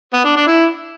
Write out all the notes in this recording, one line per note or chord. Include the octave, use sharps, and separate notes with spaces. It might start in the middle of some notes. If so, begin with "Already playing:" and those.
B3
D4
D4
E4